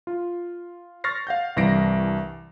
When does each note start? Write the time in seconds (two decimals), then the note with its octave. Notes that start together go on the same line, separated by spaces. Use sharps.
0.07 F4
1.04 C#6 F6 A6 A#6 C7
1.27 F5 F#5 G6
1.57 C2 G2 E3 A#6 C7 D7